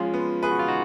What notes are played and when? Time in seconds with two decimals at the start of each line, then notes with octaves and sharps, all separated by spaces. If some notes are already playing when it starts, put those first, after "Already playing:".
Already playing: F3 G#3 C#4 F4
0.14 B3
0.43 G#4 B4
0.51 F#4
0.59 F4
0.68 D#4 F#4